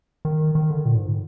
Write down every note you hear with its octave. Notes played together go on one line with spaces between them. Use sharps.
D#3
D#3
D3
A#2
G#2